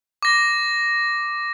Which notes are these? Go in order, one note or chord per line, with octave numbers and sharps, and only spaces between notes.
D6 A#6